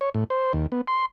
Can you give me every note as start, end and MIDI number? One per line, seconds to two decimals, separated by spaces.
0.01 0.10 73
0.14 0.24 45
0.30 0.52 72
0.53 0.67 39
0.72 0.81 59
0.88 1.06 84